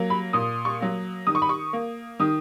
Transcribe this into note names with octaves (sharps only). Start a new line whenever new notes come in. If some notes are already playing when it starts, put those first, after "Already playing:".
Already playing: F#3 A#3
B5
A#2 D#6
C#6
F#3 A#3
D#3 D#6
C#6
B5
C#6
A#3
D#3 D#6